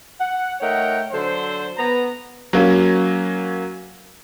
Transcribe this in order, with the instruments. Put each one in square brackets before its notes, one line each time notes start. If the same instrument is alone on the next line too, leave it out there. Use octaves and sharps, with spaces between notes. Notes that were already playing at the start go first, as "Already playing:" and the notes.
[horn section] F#5
A3 D#4 A#4 C#5 F#5 G5
D3 F#3 A4 C5
B3 A#5
[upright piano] F#3 A#3 C#4